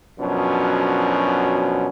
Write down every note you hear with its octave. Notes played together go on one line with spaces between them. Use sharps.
F#2 B2 F3 F#3 C#4 D4